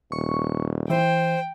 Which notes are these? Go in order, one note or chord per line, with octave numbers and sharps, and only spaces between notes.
D#1 C#6
E3 C5 G5